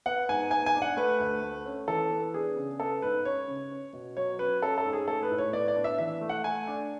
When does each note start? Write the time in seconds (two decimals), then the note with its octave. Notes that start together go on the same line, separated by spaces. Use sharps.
0.06 B3 F#5
0.29 G#2 G#5
0.51 B3 G#5
0.66 G#5
0.75 D4
0.82 F#5
0.97 A3 B4
1.20 D2
1.42 A3
1.65 C#4
1.88 E3 A4
2.11 B3
2.34 D4 G#4
2.56 C#3
2.80 B3 A4
3.02 G#2 B4
3.25 C#4 C#5
3.48 C#3
3.71 C#4
3.93 B2
4.17 F#3 C#5
4.39 C#4 B4
4.62 C#4 A4
4.78 A4
4.85 G#2
4.93 G#4
5.08 A3 A4
5.23 B4
5.31 A2
5.38 C#5
5.53 B3 D5
5.68 D5
5.76 D4
5.84 E5
5.98 E3 E5
6.21 A3
6.29 F#5
6.44 A3 G#5
6.67 D4